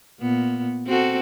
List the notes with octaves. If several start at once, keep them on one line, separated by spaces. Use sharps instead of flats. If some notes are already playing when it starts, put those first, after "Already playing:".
A#2 B3
C4 F#4 A4